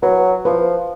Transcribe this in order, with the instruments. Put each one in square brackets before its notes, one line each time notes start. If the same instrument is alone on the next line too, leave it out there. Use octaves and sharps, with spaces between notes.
[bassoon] F#3 [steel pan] B4
[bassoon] F3 [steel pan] B4